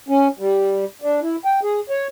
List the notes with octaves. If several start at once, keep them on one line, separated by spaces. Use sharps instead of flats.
C#4
G3
D4
E4
G5
G#4
C#5